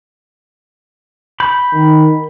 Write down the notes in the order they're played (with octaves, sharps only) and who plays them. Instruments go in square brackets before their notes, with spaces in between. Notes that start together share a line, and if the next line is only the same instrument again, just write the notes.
[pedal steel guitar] B5 G6
[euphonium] D#3